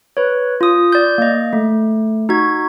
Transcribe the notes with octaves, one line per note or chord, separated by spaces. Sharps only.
B4 C#5
F4 D#6
D5 G6
A#3 D#5
A3
D#4 F#4 G#6